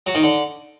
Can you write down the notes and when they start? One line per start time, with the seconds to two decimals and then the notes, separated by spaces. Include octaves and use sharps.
0.06 F#3
0.15 D#3
0.23 D3